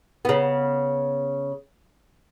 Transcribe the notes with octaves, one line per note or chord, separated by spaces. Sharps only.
C#3 B3